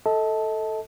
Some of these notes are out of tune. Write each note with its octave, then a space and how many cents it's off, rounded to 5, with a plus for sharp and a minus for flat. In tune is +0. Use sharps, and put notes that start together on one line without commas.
A4 +0 D#5 +40 A5 -5